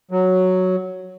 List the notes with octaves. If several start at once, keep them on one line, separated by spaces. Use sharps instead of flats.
F#3